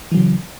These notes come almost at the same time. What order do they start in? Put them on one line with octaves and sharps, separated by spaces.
E3 F#3 C#3